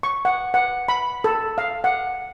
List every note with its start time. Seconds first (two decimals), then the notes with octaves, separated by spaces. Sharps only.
0.03 C#6
0.25 F#5
0.54 F#5
0.88 B5
1.24 A4
1.58 F5
1.84 F#5